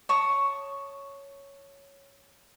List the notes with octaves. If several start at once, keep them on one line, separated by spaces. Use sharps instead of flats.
C#5 A5 C#6 D#6